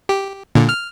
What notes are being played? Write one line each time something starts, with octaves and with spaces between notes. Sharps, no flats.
G4
A#2 D3
F6